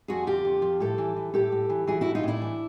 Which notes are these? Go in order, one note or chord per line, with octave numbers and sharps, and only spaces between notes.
F2 F#4 G#4
D3 F4 G4
F2
F3
A2 G4 A4
E3
E3
A2 G4 A4
A2
E3
E3 F#4 G#4
A2 E4 F#4
D#4 F4
A2 D4 E4
E3